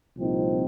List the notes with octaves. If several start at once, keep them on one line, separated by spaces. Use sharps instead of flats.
C2 A#2 F3 C4 D#4